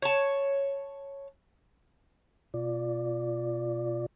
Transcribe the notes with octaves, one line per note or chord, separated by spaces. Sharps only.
C#5 A5
B2 F4 D5